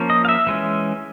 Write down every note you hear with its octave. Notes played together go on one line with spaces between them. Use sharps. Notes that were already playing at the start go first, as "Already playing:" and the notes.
Already playing: F3 A#3 C#4
D#5
F5
E5
E3 G#3 C#4